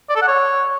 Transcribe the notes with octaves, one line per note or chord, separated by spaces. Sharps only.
D5
A4
F#5
C#5